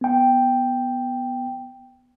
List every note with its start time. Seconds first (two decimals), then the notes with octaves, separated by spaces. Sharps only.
0.01 B3 G5